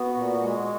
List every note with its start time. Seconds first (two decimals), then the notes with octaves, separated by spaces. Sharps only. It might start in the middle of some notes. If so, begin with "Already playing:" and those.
Already playing: B3 F#4
0.15 A#2
0.42 G#3